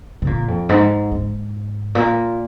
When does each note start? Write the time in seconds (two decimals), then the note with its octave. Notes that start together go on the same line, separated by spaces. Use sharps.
0.22 C#3
0.27 A#2
0.48 F2
0.69 G#2
1.11 G#2
1.95 A#2